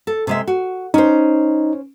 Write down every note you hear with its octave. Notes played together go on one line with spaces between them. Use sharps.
A4
C3 G#3 E5
F#4
C#4 D#4 C5